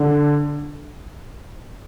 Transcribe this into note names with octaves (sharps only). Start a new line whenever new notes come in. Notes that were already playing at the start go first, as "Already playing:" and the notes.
Already playing: D3